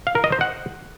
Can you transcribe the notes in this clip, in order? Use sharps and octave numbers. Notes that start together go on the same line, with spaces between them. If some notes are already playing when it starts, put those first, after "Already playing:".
F5
A#4
D#5
C5
F#5